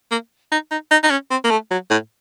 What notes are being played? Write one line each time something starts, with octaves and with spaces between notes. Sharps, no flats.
A#3
D#4
D#4
D#4
D#4
C#4
C4
A#3
A3
F#3
A2